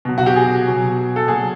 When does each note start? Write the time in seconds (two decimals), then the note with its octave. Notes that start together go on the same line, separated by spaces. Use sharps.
0.05 B2 F#3
0.18 F#4
0.26 G4
0.36 G#4
0.67 B2 F#3
1.16 A4
1.28 A#2 F#3 G#4